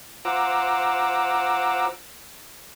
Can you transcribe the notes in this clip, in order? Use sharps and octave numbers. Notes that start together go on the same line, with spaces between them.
F4 C5 F#5 A#5 D6 E6